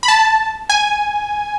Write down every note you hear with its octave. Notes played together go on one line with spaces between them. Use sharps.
B5
A5
G#5